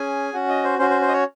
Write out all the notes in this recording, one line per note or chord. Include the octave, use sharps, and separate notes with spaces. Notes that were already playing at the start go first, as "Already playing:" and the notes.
Already playing: C#4 G#4 G#5
C#4 F#4 F#5
D#5
C5
C#4 F#4 C5
C5
C5
D#5
C#5